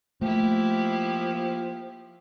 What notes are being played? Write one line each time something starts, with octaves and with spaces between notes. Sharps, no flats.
F3 A3 A#3 E4 G4